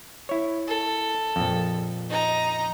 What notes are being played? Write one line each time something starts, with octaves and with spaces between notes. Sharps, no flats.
E4 C#5
A4
A#1 F2
D#4 A#5